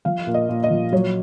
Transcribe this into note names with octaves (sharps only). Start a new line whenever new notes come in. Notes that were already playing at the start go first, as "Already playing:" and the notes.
F3 F5
A#2
D#5
A#2
D#5
F3
F#3 C#5